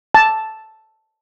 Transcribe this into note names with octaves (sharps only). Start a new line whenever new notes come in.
A5